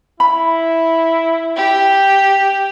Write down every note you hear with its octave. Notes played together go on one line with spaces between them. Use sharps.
E4 B5
G4